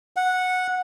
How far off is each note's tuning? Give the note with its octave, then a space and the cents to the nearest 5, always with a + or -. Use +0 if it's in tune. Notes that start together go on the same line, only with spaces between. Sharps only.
F#5 -10